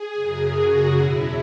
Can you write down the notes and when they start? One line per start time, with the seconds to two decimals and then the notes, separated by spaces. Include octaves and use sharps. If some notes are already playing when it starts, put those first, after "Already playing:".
Already playing: G#4
0.13 F#2 C#3 F#3
0.52 F#4
0.92 E2 B2 F#3 E4